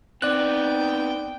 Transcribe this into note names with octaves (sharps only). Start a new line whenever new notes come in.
B3 C4 D#4 D5 G5 F#6